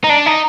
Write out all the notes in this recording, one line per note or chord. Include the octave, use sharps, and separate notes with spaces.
D#4
D4
D#4